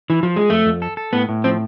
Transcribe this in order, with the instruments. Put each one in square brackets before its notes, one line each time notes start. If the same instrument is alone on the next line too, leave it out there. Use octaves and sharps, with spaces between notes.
[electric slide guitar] E3
F3
G#3
[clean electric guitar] F2 [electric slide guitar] A3
[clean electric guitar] F2
A4
A4
[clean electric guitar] A2 [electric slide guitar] B3
[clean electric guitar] A2
[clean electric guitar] F3 [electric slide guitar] C4